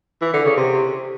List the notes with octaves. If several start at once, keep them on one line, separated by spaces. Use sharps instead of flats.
E3
D3
C#3
C3